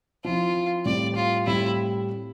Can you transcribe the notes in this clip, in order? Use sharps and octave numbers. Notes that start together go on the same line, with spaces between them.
F3 C4 E4 F4
A2 G3 C4 D5
F4
A2 G3 C4 E4